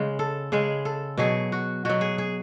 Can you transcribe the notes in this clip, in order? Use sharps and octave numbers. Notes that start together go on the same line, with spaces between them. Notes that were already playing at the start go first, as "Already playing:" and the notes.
Already playing: C#3 G#3
A4
C#3 G#3 G#4
A4
B2 F#3 G#4
F#4
B2 F#3 F#4
G#4
G#4